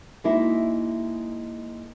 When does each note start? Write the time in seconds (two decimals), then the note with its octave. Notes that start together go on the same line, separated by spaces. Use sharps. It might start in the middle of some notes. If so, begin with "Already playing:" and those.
0.24 G#3 A#3 D#4 E4 F#4 E5